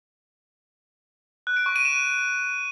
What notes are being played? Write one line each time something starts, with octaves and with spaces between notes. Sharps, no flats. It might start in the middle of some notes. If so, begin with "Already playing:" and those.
F#6
D7
C#6
D#7
E7